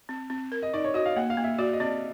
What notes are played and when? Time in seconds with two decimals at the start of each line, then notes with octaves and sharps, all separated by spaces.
0.09 C4
0.30 C4
0.52 A#4
0.63 D#5
0.73 D#4 D5
0.84 C#5
0.94 F#4 D#5
1.06 F5
1.16 A#3 F#5
1.30 F5
1.37 A#3
1.44 E5
1.59 F#4 D5
1.73 D#5
1.80 C4 D5